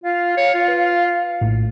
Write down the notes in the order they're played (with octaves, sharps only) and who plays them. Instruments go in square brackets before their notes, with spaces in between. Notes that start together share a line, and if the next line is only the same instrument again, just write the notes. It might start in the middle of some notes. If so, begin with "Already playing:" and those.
[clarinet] F4 [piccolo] F5
[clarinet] C#5
F4
[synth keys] B4
A#1 A2